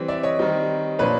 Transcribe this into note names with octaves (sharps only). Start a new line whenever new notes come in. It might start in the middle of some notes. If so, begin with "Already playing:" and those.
Already playing: E3 G3 C4
D5 E5
C#5 D#5
D#3 G3 C4
A#2 F3 A#3 D4 B4 C#5